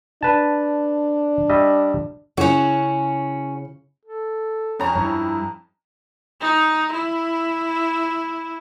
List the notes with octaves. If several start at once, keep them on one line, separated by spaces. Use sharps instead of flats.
D4 B4 A5
G3 D#5 E5
C#3 C#4 E4 F#4 C#5
A4
F2 C#4 C#5 A#5
G2 E4 C#5
D#4
E4